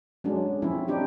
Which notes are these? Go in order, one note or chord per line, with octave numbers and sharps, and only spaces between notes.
F#3 G#3 C#4 D4
F3 C4 C#4 E4
C4 D4 D#4 G4